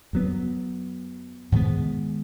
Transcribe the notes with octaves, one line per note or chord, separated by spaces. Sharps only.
F#2 F#3 B3
G#2 D#3 G#3 B3